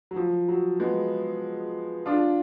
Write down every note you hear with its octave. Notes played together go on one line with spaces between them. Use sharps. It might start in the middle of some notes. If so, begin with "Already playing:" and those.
F#3
F3
F#3
G#3 B3
D4 F4